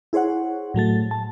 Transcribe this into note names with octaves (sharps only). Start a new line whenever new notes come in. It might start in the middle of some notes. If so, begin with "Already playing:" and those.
E4 G#4 C5 C#5 F#5
A2 F#3 A3 A6
A5